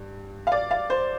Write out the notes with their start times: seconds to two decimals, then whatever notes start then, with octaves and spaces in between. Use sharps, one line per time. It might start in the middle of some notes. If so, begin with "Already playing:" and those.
Already playing: G2
0.47 F5
0.52 D5
0.71 F5
0.90 C5